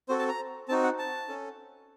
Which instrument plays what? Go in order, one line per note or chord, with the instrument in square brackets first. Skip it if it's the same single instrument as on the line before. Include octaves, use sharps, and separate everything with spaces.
[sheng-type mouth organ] C4 F#4 A4 C5
A5
A#5
C4 D#4 F#4 A5
F#5
A5
C#4 A4